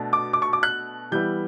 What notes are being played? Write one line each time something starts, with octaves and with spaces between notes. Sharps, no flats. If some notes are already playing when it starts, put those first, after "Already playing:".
Already playing: B2 A3 D4
D6
D6
C#6
D6
F#6
E3 G3 B3 E4 G6